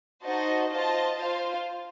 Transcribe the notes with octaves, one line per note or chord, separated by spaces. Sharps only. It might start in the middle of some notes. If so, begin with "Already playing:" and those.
D#4 F#4 C5 D#5 A5
F4 C5 D#5 A5
F4 C5 F5